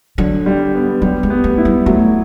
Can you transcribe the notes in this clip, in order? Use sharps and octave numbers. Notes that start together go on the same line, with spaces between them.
D3 F#3
G3
B3
F#3 G3
G#3
B3
A3
E4
G3
F#3 A3